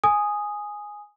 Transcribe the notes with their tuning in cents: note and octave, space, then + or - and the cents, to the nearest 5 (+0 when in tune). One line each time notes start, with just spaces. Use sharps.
G#5 +0 D#6 +0